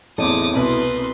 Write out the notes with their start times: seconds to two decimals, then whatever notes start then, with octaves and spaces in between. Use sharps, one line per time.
0.18 A1 E2 C4 E4 A4 D6 D#6
0.56 C2 B2 B4 C6